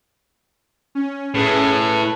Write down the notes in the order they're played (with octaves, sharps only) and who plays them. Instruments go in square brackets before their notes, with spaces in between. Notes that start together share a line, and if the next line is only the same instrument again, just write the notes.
[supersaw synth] C#4
[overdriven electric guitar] A2 [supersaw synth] C#4 G#4 B4
[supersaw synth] B4